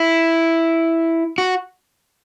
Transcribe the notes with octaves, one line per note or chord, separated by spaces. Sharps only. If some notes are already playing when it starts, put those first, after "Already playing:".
Already playing: E4
F#4